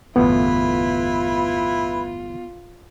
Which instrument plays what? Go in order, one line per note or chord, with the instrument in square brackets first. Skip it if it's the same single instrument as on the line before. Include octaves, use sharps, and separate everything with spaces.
[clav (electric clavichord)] G1 E2 A2 [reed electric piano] B3 [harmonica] E4 B4 B5 [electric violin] F4